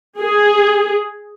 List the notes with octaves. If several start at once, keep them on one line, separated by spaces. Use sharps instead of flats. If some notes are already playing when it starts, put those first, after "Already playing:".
G#4